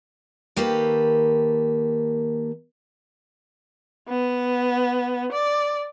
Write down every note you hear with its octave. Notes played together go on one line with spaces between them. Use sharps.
D#3 A#3 G4 A4 B4
B3
D5